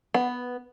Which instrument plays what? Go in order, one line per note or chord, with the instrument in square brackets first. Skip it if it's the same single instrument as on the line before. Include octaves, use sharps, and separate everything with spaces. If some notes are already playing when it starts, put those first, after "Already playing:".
[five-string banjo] B3